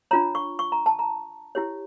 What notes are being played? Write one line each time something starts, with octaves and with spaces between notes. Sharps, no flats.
D4 F4 C#5 A#5
C#6
C#6
A#5
A5
A#5
E4 G4 C#5